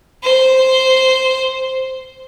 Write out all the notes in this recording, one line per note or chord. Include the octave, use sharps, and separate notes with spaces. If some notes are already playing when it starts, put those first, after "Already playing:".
C5